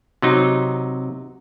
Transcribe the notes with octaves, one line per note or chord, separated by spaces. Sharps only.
C3 F#3 D#4